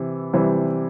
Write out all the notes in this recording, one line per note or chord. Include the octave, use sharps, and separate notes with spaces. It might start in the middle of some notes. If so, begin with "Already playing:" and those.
Already playing: C3 E3
C3 E3 G3